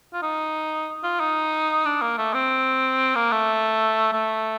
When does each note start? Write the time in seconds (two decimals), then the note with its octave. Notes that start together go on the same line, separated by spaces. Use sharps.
0.13 F4
0.22 D#4
1.04 F4
1.20 D#4
1.85 D4
2.01 A#3
2.18 A3
2.34 C4
3.15 A#3
3.32 A3
4.13 A3